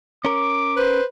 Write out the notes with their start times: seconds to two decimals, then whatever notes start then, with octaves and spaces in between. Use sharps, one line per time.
0.25 C#4 A#4 D6
0.76 B4 C5